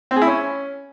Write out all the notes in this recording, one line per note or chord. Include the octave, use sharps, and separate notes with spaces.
C4
G#4
E4
C#4